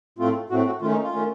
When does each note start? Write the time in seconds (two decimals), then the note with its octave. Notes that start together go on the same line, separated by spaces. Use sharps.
0.18 A2 A3 C4 F4
0.49 A2 A3 C4 F#4
0.66 F#4
0.82 D#3 A3 C#4 F4
0.91 D#4
1.02 F4
1.13 D#3 A3 C#4